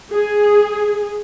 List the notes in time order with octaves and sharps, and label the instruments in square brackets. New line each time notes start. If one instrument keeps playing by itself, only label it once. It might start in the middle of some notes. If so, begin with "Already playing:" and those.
[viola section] G#4